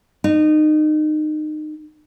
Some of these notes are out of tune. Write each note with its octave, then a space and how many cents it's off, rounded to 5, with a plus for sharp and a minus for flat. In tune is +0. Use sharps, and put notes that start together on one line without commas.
D#4 -25